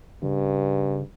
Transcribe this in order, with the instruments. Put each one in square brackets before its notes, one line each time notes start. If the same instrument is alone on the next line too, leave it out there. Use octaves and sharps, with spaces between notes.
[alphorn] G2 [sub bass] C#3